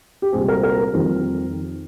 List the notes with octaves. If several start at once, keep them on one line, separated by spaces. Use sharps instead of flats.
G4
C2 A#2 G#3 C4 G#4
A#4
A#4
F2 D#3 G3 C4